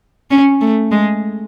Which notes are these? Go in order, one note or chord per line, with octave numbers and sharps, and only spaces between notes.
C#4
A3
G#3